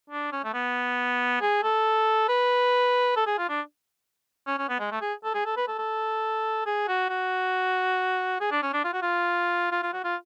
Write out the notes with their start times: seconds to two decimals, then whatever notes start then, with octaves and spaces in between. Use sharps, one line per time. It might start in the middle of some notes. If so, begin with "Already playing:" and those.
0.10 D4
0.32 C#4
0.44 A3
0.54 B3
1.41 G#4
1.63 A4
2.29 B4
3.16 A4
3.27 G#4
3.38 F4
3.49 D4
4.47 C#4
4.58 C#4
4.69 B3
4.80 G#3
4.91 A3
5.02 G#4
5.24 A4
5.34 G#4
5.45 A4
5.57 B4
5.68 A4
5.79 A4
6.66 G#4
6.88 F#4
7.09 F#4
8.40 G#4
8.52 D4
8.62 C#4
8.73 D4
8.84 F4
8.93 F#4
9.02 F4
9.72 F4
9.83 F4
9.93 F#4
10.04 F4